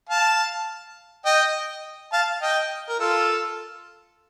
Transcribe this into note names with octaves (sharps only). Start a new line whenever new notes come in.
F5 A5
D#5 G5
F5 A5
D#5 G5
A#4
F4 A4